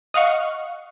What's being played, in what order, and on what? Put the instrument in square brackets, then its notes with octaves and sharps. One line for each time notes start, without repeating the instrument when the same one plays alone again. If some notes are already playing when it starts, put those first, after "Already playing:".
[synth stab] D#5 F5 F#5 C#6